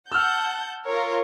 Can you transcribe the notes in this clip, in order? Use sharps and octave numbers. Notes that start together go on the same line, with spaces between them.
F#5 A5 E6 F6 G6
F4 A#4 C#5